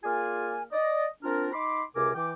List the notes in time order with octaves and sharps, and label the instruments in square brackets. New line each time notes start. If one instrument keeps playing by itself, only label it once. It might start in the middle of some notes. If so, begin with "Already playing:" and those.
[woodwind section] A#3 F4 G#4 D5 F5 G#5
D5 D#5
C4 D4 F4 A#4
D#4 B5 C6 D6
C#2 C3 A#4 G#5 D6
E3 G5 D6